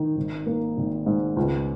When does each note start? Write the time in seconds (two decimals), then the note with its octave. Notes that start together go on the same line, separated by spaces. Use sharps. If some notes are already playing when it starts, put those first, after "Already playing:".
Already playing: D#3
0.17 G#1
0.46 A#3
0.77 G#1
1.06 G#2
1.37 C#2